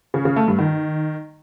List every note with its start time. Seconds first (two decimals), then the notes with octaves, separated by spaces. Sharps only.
0.14 C#3
0.25 C#3
0.36 A3
0.47 G2
0.59 D#3